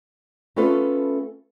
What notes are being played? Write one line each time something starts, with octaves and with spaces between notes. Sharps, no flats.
A3 B3 C#4 F4 A4 B4